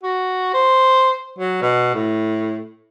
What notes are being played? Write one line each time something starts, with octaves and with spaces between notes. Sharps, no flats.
F#4
C5
F#3
B2
A2